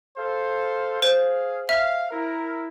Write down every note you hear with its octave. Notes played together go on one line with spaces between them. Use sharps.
A4 C5 F5
G#4 C5 F5
E5 F5
E4 A#4